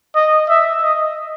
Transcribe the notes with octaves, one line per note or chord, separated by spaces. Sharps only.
D#5
E5
D#5